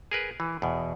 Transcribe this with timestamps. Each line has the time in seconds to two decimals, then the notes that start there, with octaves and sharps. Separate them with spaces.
0.11 G#4 A#4 B4
0.40 E3
0.62 E2 B2